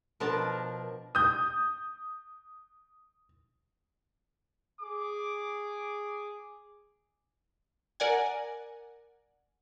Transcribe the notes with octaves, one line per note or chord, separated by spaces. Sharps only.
B2 F3 D4 A#4 A5
D#6 G6
G#4 D6
A#4 D5 F#5 G#5